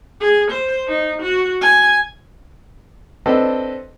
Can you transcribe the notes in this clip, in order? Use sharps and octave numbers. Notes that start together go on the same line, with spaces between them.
G#4
C5
D#4
F#4
G#5
C4 D4 A4 B4 D#5